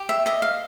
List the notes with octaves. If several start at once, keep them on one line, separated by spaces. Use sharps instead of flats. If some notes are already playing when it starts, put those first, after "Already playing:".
Already playing: G4
E5
D#5 E5
F5